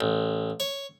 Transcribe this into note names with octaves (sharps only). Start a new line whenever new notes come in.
A1
C#5